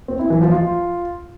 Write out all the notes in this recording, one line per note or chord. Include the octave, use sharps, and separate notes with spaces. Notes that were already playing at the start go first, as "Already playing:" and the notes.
C4
E4
E3
F3
F4